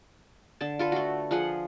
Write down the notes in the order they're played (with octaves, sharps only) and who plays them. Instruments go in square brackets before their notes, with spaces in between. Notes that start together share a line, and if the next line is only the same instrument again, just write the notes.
[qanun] D3 A5
F4 A4 B4
A3 F#4
F3 F4 G#4 F#5